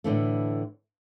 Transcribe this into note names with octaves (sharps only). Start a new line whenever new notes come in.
A2 D3 E3 A3